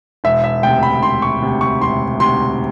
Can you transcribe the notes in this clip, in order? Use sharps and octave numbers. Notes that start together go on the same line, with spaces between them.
E1 E5
E5
D2 C3 G5
B5
E1 C6
C#6
D2 C3
C#6
E1 C6
D2 C3 C6